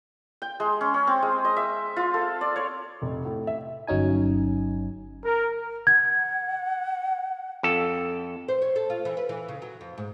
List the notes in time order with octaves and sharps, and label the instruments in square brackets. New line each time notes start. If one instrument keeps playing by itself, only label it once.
[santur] G5
G#3
C#4
C#4
C4
G#3
D#5
E5
F4
A4
D5
C#5
[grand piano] F1
A2
E5
[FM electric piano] G1 F#3 C#4 D#4 G#5
[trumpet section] A#4
[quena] F#5 [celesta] G#6
[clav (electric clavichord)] F2 A4
[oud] C5
C#5
A4
F4
E3
B4
E3
C#3
F#3
F2
G#2